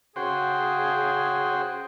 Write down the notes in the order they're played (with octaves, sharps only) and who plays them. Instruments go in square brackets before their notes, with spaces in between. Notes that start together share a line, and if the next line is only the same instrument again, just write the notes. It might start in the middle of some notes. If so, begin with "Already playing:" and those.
[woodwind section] C#3 G#4 [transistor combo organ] F#4 C5 G5